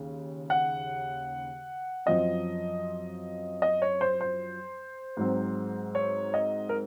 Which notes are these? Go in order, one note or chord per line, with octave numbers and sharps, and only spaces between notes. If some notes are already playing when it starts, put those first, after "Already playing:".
Already playing: D#2 C#3
F#5
F#2 F3 C4 D#5
D#5
C#5
C5
C5
G#2 F#3 C4
C#5
D#5
A#4